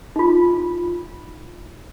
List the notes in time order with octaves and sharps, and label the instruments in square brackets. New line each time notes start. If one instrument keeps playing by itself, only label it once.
[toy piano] D#4 F4